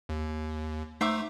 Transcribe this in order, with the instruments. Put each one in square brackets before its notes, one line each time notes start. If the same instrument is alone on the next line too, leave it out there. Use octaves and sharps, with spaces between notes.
[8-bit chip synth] D#2
[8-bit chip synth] A3 D#4 [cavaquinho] C5 E5 D6